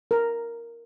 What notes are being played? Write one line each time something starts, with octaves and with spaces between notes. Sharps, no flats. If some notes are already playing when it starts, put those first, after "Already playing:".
A#4